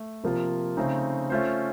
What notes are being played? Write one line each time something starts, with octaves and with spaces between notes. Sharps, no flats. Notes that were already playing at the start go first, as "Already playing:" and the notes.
Already playing: A3
C3 F3 A#3 F4
C#3 A3 C4 D#4
A3 C#4 F4 C5